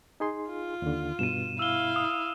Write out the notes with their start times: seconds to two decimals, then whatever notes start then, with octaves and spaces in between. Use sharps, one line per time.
0.20 D#4 G#4 C6
0.50 F4
0.82 D#2 D3
1.19 G2 B2 D#7 E7
1.59 E4 F5 E6 G7
1.96 D#6